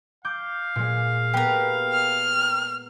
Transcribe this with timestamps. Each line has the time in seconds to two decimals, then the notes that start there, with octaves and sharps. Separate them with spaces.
0.25 F5 D6 G6
0.76 A#2 G#3
1.34 B3 G4 A#4
1.93 F6